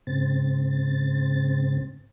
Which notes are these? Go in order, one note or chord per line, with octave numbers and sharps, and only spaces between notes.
G#2 C#3 C4 A6